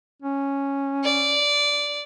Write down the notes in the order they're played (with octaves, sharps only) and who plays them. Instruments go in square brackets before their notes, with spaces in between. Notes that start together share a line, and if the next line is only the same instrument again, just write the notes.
[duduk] C#4
[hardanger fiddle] D5